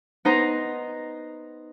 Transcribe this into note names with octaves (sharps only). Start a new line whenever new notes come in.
B3 D#4 C5 A#5